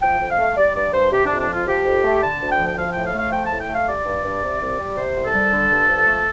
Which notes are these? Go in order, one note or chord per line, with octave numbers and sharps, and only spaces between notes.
F3 G5
F2
F5
A3
G3 D5
G2 D5
G2 C5
C3 G4
D4
F2
D4
F3 F4
F3 G4
F2
A3
D3 A5
D2
G5
F3
G5
F3 F5
A2 G5
F5
A3
F5
F3 G5
A5
A2
G5
A3 F5
G3 D5
G2
G2
C3
C2
G3
C3 C5
C2
A4
G3
D3
G2
F3
A3